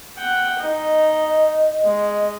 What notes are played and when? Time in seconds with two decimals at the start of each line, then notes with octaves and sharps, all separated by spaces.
0.18 F#5 G5
0.60 D#4 D#5
1.85 G#3